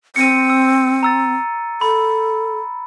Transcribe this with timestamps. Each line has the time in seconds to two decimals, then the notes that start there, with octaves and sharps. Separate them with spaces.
0.16 C4 C#7 D#7
0.50 E6
1.03 A#5 E6 A6
1.81 A4 B5